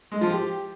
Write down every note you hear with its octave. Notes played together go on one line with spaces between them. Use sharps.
G#3
F3
G4